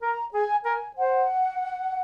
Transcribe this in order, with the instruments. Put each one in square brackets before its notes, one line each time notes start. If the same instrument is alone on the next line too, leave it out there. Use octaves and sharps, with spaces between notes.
[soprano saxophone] A#4 [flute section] A#5
[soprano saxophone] G#4 [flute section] G#5
[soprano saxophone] A#4 [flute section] G#5
[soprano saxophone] C5 [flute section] F#5